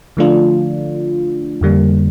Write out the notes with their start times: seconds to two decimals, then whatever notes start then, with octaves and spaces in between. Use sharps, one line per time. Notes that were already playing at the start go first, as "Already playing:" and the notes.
0.17 D3 F3 A3 D4 F4
1.61 F2 D3 G3 A#3